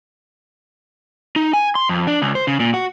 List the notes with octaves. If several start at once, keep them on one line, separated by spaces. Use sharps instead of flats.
D#4
G#5
C6
F2
D4
C#2
C5
C#3
A#2
F#4